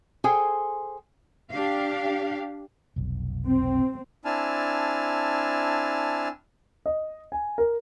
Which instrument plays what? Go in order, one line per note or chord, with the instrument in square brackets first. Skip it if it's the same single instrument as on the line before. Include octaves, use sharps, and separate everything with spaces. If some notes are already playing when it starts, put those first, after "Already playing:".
[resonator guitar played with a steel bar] G#4 A4 C5 G5 G#5
[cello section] D4 G4 F5
[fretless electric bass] F1 B1
[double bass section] C4
[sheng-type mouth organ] C4 D4 E4 G#5 A5 F6
[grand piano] D#5
G#5
A#4